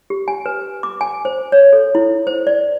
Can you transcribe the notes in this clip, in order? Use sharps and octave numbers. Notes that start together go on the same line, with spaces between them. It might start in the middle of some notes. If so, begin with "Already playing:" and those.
G4
G#5
B4
D6
G#5
C5
C#5
A4
E4
C5
D5